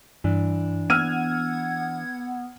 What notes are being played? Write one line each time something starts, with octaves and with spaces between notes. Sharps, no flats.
G2 E3 D4
B3 F#5 E6 F6 G#6 D#7